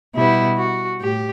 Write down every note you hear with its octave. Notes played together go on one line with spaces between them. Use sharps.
B2 G3 B3 E4
F#4
A2 G4